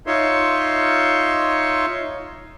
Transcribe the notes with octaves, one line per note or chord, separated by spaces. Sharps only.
D#4 F4 C#5 E5 C6